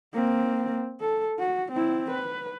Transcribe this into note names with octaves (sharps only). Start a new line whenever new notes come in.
A#3 C4
A4
F#4
C4 E4
B4